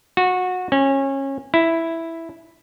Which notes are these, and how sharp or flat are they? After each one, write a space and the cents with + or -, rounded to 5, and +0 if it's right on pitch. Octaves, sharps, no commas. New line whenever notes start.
F#4 -20
C#4 -25
E4 +0